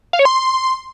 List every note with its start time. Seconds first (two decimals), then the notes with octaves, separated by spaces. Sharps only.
0.13 F5
0.19 C#5
0.25 C6